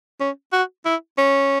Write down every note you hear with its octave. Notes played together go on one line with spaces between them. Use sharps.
C#4
F#4
E4
C#4